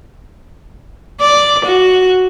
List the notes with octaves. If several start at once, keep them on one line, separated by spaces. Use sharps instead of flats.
D5
F#4